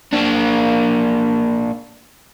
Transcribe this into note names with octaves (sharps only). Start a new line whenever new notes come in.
A#3 D4